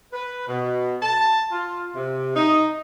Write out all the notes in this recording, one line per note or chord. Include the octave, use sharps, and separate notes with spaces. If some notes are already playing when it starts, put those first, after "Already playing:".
B4
B2
A5
F4
C3
D#4